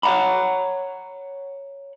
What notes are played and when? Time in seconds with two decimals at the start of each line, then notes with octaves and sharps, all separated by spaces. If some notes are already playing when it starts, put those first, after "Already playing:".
0.03 C#5 D5 F#5 A#5 B5